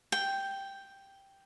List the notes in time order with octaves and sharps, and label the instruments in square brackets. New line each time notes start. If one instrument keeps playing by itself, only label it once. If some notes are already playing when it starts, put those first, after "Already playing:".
[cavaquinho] G5